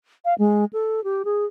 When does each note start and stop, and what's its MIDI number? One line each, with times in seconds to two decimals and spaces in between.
0.25 0.34 77
0.39 0.65 56
0.73 1.03 69
1.04 1.23 67
1.25 1.45 68